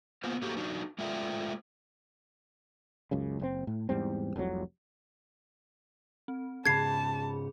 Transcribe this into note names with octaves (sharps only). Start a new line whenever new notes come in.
A#3 B3 F4 C5
A3 A#3 F#4 G4 C5 A#5
F#3 D4 D#4
G#3 A3 F4 D5 E5 G5
C#2 F#2 C#3
F#1 A2 C4
A2
E2 G#2 G3 C4
F1 C2 F2 F#3
C4
G#2 C#3 C#4 G#4 A5 B5 G#6 C7